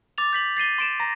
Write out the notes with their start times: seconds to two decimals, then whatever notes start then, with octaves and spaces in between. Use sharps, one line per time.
0.18 D6 A6 F7
0.33 G6 B6 F#7
0.57 A6 C7 D#7 G7
0.78 C6 D7 E7
1.00 A#5 A#6